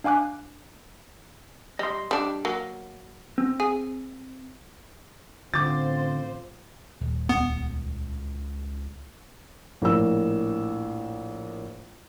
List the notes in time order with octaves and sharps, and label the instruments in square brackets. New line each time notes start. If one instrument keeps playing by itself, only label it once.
[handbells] D4 F5 G#5 D6 F#6
[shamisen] G3 [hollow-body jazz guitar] D#5 C6
[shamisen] G3 D4
F#3 A#3
[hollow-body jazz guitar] C4
[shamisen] G#4
[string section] A1 C5 [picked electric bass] D3 [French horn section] C4 F4 [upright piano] D6 A6
[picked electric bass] D#1
[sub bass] C#2 [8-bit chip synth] B3
[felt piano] A#1 A2 A#4 E6